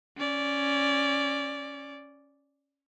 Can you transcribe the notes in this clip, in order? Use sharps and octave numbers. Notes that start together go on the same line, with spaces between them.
C#4 D5